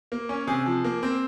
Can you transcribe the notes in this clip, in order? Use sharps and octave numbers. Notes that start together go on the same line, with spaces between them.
A#3
C#4
C3 G#4
F3
A#3
C4